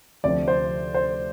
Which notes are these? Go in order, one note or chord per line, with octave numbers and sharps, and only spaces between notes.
D2 C3 F3 C4 D5
C5
C5